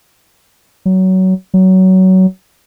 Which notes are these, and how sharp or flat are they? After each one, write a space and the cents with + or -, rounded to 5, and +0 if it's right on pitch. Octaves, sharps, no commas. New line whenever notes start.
F#3 +20
F#3 +20